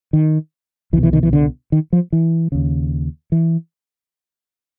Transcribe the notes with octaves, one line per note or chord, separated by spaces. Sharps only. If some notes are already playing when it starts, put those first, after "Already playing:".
D#3
C2 B2 E3
E3
D#3
E3
D3
D#3
F3
E3
D#2 C#3
E3